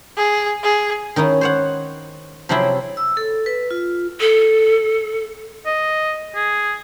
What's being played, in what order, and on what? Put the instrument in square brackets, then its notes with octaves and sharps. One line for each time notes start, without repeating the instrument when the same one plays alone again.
[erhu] G#4
G#4
[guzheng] D#3 C#4 D#4 E4
C5 C#5 F#5
C3 F3 F#3 C4 E4 G#4
[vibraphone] E6
A4
B4
F4
[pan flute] A4
[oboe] D#5
G#4